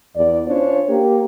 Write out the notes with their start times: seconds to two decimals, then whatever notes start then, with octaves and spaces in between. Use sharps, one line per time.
0.16 E2 D5
0.48 C#4 D4 F4 C5 C#5
0.89 A#3 G4